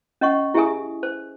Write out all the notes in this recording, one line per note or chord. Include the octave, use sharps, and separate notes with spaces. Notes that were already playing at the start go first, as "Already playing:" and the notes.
C#4 D#5 F#5 C#6
E4 G4 G#4 E5 G#5 D#6
C5